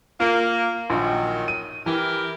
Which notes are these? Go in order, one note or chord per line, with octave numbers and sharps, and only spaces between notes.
A#3 F4
A#1 D#3 F#3
D#7
E3 E4 G4 A#4